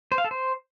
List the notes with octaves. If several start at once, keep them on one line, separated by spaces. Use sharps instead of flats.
C5
F5
A4
C5